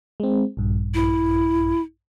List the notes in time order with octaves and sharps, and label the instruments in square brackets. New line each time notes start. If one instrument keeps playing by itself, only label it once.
[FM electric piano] G#3 C4
A#1 G2
[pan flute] E4